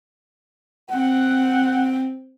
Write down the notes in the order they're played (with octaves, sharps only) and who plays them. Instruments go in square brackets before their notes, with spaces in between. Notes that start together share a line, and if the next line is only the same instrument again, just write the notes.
[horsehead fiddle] C4 [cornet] F#5